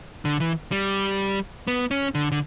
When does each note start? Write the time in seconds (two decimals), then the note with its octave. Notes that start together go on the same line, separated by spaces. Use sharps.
0.25 D3
0.40 E3
0.72 G3
1.67 B3
1.91 C#4
2.15 D3
2.32 D3